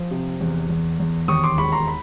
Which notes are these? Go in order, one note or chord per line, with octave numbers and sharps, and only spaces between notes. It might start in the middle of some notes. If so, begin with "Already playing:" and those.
Already playing: F3
C3
E2
E2
E2
D#2 C#6 D#6
C6 D6
E1 B5 C#6
A#5 C6
B5